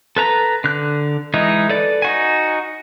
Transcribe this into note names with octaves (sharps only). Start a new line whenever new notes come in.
A4 B4 A#5
D3 F#6
E3 G#3 D#4
A4 B4 D5
D#4 F#4 G#5